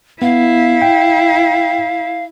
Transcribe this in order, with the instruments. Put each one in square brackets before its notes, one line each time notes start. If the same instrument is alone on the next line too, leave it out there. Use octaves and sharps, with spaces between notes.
[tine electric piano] B3 [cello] E4 [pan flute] F5
[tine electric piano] G5